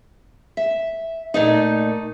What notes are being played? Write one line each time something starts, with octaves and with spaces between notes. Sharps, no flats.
E5
A#2 A3 D#4